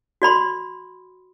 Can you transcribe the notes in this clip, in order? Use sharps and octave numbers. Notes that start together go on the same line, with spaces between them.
F#4 D5 B5 C6